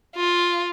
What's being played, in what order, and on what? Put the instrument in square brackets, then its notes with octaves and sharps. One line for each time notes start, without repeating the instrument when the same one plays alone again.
[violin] F4